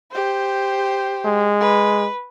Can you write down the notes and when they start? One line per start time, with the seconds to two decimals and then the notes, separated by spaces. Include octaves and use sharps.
0.12 G4 C5
1.25 G#3
1.60 B4